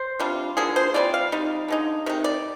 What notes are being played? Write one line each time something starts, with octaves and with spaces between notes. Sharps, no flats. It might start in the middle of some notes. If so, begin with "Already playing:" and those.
Already playing: C5
C3 G3 D4 F4
D3 F3 A#3 G#4
C5
C3 G3 D4 F4 D5
F5
G3 C4 D#4
D3 G#3 D#4
C3 D#3 D#4
D5